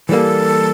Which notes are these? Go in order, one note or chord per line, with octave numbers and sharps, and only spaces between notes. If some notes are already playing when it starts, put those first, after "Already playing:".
E3 G3 A#3 A4